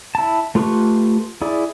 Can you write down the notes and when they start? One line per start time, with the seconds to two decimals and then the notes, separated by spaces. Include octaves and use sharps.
0.15 E4 A5
0.55 A3 F4 G4 B4 C#6
1.42 E4 G#4 D5